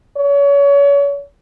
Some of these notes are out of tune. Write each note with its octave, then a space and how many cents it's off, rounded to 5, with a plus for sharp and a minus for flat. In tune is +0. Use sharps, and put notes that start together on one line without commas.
C#5 +35